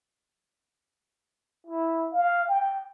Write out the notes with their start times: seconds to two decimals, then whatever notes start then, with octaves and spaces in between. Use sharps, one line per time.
1.67 E4
2.12 F5
2.48 G5